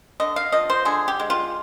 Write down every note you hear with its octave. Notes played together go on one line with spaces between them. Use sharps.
D3 D#5
F5
F3 D#5
C5
D3 G#4
G4
G#3
F4